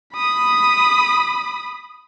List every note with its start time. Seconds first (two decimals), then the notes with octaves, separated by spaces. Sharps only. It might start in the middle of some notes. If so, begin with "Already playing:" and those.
0.14 B5 D#6